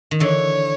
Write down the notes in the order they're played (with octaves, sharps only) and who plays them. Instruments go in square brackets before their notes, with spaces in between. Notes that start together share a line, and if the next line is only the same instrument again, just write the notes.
[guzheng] D#3
[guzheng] D3 E3 [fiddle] C#5